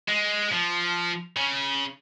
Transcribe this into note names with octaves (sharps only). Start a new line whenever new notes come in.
G#3
F3
C#3